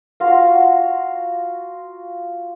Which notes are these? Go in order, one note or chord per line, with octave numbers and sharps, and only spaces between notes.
F4 F#4 F5 A#5